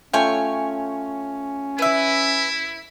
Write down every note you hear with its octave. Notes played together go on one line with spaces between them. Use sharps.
A3 C#4 F4 C#5 G5 G#5
E4 B4 E5